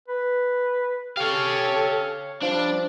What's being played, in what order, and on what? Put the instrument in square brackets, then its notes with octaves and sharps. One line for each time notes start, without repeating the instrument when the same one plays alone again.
[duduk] B4
[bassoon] G4 [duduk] A4 [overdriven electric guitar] C#5 F5
[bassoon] F3 [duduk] G3 [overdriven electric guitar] D4